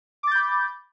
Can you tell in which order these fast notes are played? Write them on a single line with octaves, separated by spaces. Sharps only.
D6 A6 G6 B5